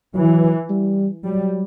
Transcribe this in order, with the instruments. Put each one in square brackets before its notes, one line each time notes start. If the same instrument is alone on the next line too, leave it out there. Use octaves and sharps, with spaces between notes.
[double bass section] E3 [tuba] F#3
[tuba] G3
[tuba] F#3 [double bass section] G3